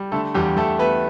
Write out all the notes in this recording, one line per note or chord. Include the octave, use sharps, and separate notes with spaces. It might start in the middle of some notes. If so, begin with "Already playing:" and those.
Already playing: G3
D3 A3 A4
E2 G3 G4
E2 A3 A4
A3 B3 B4